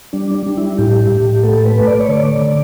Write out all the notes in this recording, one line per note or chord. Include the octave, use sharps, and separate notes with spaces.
G3 D4
D4
G3
E4
A2 G4
A2
A3 A4
B4
A3
D5
C#5
D3 D5
D3